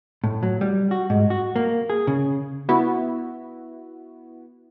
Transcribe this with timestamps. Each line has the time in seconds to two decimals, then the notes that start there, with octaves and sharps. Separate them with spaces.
0.24 A2
0.43 F#3
0.61 G3
0.91 F#4
1.10 G#2
1.30 F#4
1.56 A#3
1.90 G#4
2.07 C#3
2.69 B3 E4 F#4